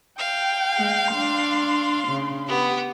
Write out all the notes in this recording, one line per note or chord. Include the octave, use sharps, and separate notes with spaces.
F5 G5
G#3
D4 C6
C#3
B3 G4